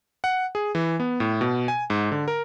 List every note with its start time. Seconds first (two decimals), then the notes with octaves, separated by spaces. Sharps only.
0.24 F#5
0.55 G#4
0.75 E3
1.00 B3
1.20 A2
1.41 B2
1.68 G#5
1.90 G#2
2.12 D3
2.28 A#4